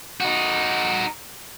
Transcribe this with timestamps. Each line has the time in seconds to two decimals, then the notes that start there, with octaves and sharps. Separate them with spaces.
0.21 D#4 F#4